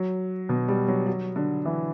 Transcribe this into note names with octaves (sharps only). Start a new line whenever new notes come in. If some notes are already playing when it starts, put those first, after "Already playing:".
Already playing: F#3
B2
G3
F#3
F#3
D3
E3